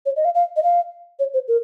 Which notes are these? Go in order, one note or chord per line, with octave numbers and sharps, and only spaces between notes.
C#5
D#5
F5
F5
D#5
F5
C#5
C5
A#4